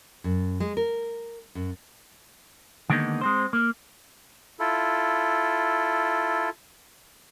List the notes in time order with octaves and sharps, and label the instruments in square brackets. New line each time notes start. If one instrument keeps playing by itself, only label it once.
[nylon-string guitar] F#2
G#3
A#4
F#2
[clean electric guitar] D3 D#3 G#3 A#3 B3 D#4
G#3 C4 C5
A#3
[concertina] E4 F4 A4